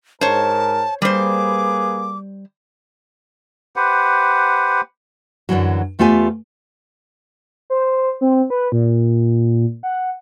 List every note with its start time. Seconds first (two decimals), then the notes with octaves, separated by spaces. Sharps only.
0.21 G#2 A#4 C5 C#5 A5
1.02 G3 A#3 G#4 B4 C5 D6
3.76 G4 B4 C5 F#5
5.49 F#2 A2 D3 E3 F#3
5.99 E2 A3 B3 F4 G4 G#5
7.70 C5
8.21 C4
8.50 B4
8.72 A#2
9.83 F#5